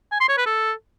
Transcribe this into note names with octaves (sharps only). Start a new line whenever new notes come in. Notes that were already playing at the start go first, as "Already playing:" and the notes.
G#5
C6
C#5
B4
A4